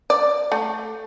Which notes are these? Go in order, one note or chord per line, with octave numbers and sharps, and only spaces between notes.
D5
A3